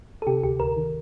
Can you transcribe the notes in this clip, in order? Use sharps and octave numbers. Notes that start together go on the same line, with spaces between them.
A4
C3 G4
D2 G4
D2 A#4
D#3